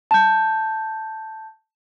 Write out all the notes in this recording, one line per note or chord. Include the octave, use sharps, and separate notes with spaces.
A5 G6